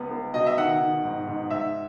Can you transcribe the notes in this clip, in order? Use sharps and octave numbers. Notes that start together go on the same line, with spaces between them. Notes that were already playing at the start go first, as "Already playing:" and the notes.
Already playing: C#2 B3
B3
B2 D#5
E5
D#3 F#5
D#3
G#2
G#2
G#2 E5